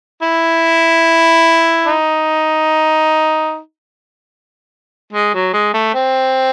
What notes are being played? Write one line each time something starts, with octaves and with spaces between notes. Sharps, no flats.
E4
D#4
G#3
F#3
G#3
A3
C4